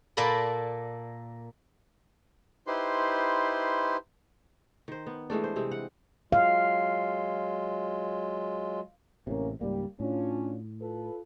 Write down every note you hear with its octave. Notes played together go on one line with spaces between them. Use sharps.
A#2 A#3 A4 D5 B5
D#4 E4 G4 B4 C5 C6
D#3 C5
B3
E3 G#3 A3 D4
C5
C3 G3 G#3 C4
F#5
F#3 G#3 F4 F5
A1 A2 C3 A#3 C#4
C#2 G#2 G3 A#3
A2 C#4 D4 F4
F4 A4 B4